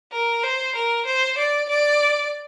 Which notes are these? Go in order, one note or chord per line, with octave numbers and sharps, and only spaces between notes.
A#4
C5
A#4
C5
D5
D5